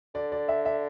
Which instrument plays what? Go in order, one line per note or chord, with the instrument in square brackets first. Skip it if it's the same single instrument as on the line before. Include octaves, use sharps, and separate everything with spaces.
[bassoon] D3 [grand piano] D5
[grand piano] D5
E5
E5